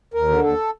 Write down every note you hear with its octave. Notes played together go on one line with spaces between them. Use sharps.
D#2 A#4
D3
D#2 A4